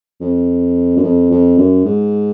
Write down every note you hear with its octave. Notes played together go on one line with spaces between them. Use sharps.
F2
F#2
F2
F2
F#2
G#2